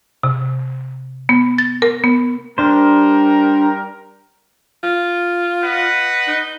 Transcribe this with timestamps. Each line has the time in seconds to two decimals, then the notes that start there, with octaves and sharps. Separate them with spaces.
0.23 C3
1.29 B3
1.58 A6
1.82 A#4
2.04 B3
2.58 G3 D4 A#4 C5
4.83 F4
5.64 B4 D#5 F#5
6.27 D#4